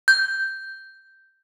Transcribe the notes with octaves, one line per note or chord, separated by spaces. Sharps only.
G6